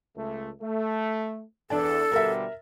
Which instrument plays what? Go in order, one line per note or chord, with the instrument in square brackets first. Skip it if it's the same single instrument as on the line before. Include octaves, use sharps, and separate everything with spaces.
[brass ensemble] C#2 A3
A3
[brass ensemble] E2 [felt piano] D4 D5 A5 [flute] A4
[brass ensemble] B2 D3 G3 [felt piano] A#4 E5